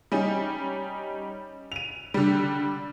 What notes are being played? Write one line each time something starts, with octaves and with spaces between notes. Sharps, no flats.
G3 C#4 D#4
D#7 F7
D3 G3